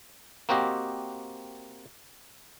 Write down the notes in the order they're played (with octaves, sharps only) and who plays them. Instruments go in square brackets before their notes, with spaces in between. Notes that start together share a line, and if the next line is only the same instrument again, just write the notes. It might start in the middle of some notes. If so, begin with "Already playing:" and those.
[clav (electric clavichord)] A#3 C4 F#4 G4 D#5